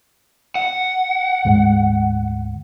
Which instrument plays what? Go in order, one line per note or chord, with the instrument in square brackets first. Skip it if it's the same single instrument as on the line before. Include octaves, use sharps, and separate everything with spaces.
[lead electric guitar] F#5
[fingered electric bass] D2 G#2 G#3